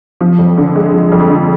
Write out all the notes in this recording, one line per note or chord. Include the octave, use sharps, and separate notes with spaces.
F3
F2
D3
G#3
F3
F2
D3